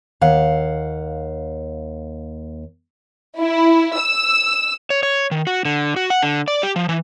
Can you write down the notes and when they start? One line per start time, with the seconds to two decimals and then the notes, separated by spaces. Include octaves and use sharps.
0.21 D#2 F5 F#5
3.38 E4
3.98 E6
4.90 C#5
5.03 C#5
5.31 D#3
5.47 F#4
5.65 D3
5.96 F#4
6.10 F#5
6.23 D3
6.48 D5
6.63 G4
6.76 F3
6.89 E3